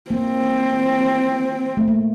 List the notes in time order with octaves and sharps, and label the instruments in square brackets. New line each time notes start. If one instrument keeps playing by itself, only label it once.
[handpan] A#3 [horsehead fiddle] C4
[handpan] A3
A#3